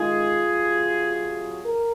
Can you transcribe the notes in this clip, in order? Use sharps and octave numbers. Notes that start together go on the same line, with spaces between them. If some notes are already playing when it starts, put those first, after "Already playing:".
Already playing: C3 D#3 G#3 F4 G#4
C3 F#3
A#4